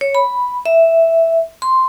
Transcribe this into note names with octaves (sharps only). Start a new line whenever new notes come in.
C#5
B5
E5
C6